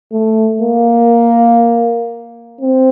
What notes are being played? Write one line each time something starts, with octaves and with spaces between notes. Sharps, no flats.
A3
A#3
C4